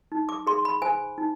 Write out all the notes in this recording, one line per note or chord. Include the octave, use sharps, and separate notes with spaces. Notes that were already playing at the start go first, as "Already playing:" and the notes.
D#4
D6
G#4 C6
B5
C5 G#5
D#4